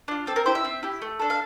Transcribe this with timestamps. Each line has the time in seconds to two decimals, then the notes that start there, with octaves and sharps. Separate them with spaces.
0.08 D4 F4
0.27 C4 A4
0.36 A#4
0.46 E4 G4 C5
0.55 E5
0.65 C4
0.83 E4 G4
1.02 A3
1.19 D4 A4
1.30 F5